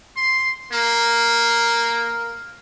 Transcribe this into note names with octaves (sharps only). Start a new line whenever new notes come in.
C6
A#3 A#4